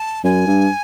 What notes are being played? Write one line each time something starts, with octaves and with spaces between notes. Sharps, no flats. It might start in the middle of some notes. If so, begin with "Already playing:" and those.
Already playing: A5
F#2 G#5
G2